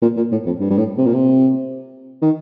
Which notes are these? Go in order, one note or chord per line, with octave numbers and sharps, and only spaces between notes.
A#2
A#2
A2
F2
G2
G2
A2
C3
A#2
C3
D#3